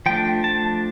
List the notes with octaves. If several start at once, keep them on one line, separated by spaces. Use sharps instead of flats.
F3 A3 D4 G5
A5